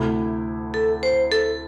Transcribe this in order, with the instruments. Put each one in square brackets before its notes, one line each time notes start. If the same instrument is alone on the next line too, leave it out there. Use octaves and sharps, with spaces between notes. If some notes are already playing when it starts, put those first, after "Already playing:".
Already playing: [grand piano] D2 C3 A3 E4
[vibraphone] A4
C5
A4